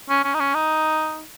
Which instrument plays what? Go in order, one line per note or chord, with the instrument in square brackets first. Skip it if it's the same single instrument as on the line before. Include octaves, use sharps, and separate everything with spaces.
[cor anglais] C#4
C#4
D#4
C#4
D#4